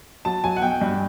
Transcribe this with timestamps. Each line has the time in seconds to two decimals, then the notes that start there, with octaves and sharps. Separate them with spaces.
0.25 F#3 A5
0.44 F#3 G#5
0.57 F#5
0.62 B1 G5
0.81 G2